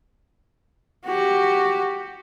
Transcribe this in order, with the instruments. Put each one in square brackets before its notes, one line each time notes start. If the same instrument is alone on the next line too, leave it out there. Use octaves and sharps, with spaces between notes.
[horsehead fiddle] F#4 G4